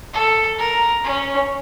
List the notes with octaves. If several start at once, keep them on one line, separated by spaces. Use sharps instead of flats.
A4
A#4
C#4